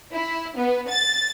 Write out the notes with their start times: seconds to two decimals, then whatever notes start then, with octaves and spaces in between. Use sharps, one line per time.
0.13 E4
0.57 B3
0.89 A6